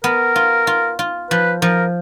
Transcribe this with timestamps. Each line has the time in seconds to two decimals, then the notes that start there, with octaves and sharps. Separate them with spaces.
0.04 B3 A#4
0.36 F4
0.67 F4
0.99 F4
1.31 F3 B4
1.62 F3 A#4